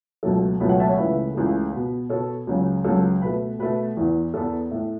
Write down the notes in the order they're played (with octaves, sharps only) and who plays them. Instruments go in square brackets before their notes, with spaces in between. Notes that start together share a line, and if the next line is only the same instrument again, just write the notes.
[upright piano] C#2 B2 F#3 A3 A4
C#2 B2 F#3 A3 B4
C#5 F#5
E5 A5
C#5 F#5
C#2 C#3 E3 A3 B4 E5
C#2 C#3 E3 A3
B2 B3
B2 B3 A4 C#5
C#2 C#3 F#3
C#2 C#3 F#3 A4
B2 A3 B4
B2 A3 B4
E2 E3 B3
E2 E3 B3 A4
A2 A3